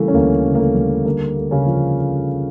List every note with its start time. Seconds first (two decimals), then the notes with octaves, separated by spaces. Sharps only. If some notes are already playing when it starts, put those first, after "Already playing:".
Already playing: C#3 E3 G3 A3 A#3
0.08 C#4
0.14 D2 A#3
0.44 C#3
0.55 A#3
0.59 A3
0.75 G3
1.06 D3 A#3
1.37 A3
1.51 C#3 C#4
1.66 F3